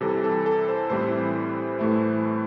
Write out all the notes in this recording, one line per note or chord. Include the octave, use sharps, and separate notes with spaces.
C3 E3 G3 A4
A4
A4
C5
A2 E3 G3 C4 E4 C5
A2 E3 A3 E4